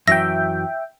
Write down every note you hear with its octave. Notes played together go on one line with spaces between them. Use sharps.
F#2 E3 F#3 E5 G5 A#6